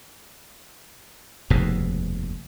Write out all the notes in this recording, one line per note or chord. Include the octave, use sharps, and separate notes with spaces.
F1 D#2 G#2 B2